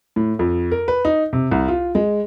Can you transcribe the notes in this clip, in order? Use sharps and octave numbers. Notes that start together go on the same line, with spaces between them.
A2
F2
A#4
B4
D#4
C3
C2
F4
G#3